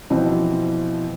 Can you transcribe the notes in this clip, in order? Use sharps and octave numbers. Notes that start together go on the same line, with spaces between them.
B2 E3 F3 C4